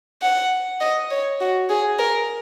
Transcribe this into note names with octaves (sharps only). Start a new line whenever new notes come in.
F#5
D#5
C#5
F#4
G#4
A#4